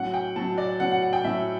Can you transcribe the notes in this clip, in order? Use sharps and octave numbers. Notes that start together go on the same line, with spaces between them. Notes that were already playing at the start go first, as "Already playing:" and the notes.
Already playing: A2 F#3 C#4 F#5
G5
A2 F#3 C#4 A5
D5
A2 F#3 C#4 F#5
F#5
F#5
G5
A2 F#3 C#4 E5